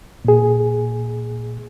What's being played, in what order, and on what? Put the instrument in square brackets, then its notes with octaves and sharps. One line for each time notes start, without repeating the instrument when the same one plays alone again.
[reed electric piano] A#2 G#4